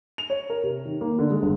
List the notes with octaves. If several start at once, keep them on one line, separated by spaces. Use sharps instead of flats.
F7
C#5
A#4
C3
D#3
A#3
D3
G#3
G1